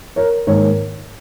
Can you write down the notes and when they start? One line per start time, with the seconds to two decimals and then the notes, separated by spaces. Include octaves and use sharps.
0.16 A#4 C#5
0.47 G#2 D#3 A#3 A#4 C#5